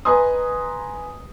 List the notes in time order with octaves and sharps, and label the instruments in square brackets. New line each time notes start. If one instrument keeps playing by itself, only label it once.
[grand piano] B4 D#5 G#5 A#5 C6 D#6